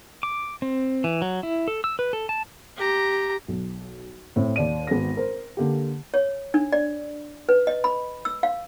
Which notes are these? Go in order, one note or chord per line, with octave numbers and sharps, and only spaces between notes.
D6
C4
E3
F#3
E4
A4
E6
B4
A4
A5
G4 A#5
B1
A2 C4
D#2 D5 D#7
G#1 B3 A#6
A#4 C5
D3 A#3 G4
C#5
D4
D5
B4
D#5
B5
E6
F5